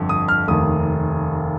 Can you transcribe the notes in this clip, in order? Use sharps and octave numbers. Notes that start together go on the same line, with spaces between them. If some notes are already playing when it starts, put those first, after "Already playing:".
Already playing: G1 F2
D#6
F6
F1 D#2 D#3 D#6